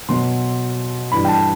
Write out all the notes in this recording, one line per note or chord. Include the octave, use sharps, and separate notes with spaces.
B2 F#3 C6
G2 E3 G3 B5
G5
A5